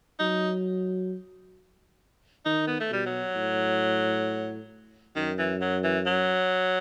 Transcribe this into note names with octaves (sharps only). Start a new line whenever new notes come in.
F#3 D#4
D#3 D#4
B3
A3
B2 G3
F#3
A2
F#2 D#3
E3
F#3
E3
F#3